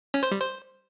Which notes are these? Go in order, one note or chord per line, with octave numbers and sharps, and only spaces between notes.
C#4
C5
G3
C5